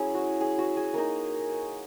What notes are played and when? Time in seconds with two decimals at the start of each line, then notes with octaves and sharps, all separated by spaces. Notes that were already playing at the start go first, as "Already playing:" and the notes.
Already playing: F#3 C#4 E4 G#4
0.15 F#4
0.41 G#4
0.58 F#4
0.77 G#4
0.94 A#3 D#4 A#4